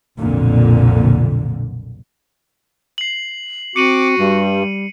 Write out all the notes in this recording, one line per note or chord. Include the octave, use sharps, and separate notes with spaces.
B1 F2 A#2 D3
C7 F#7
C4 F#4 D6 C#7 D#7 F#7
G2 G3